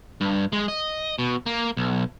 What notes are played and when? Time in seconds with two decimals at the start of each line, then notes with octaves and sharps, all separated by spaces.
0.21 G2
0.53 G#3
0.68 D#5
1.19 B2
1.46 A#3
1.77 B1